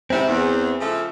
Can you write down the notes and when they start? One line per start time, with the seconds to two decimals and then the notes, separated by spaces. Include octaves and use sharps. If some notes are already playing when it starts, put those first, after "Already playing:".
0.10 G#2 C3 C4 E4
0.28 E2
0.80 C#3 F3 A3